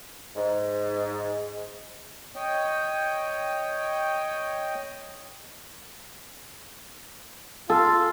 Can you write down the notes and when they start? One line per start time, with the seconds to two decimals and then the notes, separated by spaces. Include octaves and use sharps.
0.36 G#2
2.36 C#5 D#5 G5
7.70 F4 A4 F5